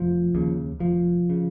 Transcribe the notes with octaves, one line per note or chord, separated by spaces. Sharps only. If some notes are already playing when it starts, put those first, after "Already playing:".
Already playing: F1 F3
D#2 C#3
F1 F3
C#3